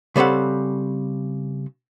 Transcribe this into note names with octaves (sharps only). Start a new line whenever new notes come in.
C#3 G3 C4 A4 F#5